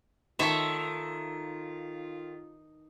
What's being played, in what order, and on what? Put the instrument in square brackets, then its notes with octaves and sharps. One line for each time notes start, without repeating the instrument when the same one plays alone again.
[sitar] D#3 [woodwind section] F4 [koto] A4 C#5 E5 [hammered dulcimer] C6